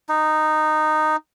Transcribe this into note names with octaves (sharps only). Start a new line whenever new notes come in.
D#4